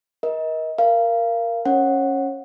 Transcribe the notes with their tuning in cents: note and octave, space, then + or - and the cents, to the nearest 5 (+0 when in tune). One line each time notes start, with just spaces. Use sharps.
A#4 +35 D#5 +30
A#4 +0 F5 -25
C#4 -10 C#5 -30 F#5 +0